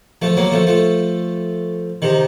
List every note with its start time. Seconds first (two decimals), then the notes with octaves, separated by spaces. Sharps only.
0.22 F3 A3
0.37 F#3 A#3
0.51 F3 A3
0.67 F3 A3
2.02 C3 D#3